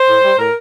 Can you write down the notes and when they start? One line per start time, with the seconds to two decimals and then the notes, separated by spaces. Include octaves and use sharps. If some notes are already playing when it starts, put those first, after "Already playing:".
Already playing: C5
0.08 A2
0.23 G3
0.39 A2 A#4